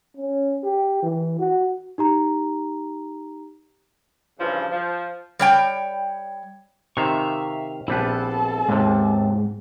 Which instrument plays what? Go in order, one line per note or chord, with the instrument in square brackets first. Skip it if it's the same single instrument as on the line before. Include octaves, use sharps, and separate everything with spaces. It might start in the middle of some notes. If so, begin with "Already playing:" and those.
[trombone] C#4
G4
E3
F#4
[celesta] D#4 G4 A#5
[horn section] G2 C#3 E3 F3
F3
[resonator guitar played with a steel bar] G3 C#5 G5
[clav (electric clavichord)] C3 D#3 [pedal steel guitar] E5 F5 C#6
[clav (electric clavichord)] A#1 G3 B4 [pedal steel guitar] B3 C4 E4 [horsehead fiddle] A4 A5
[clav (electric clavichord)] D#2 C3 [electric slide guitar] G#2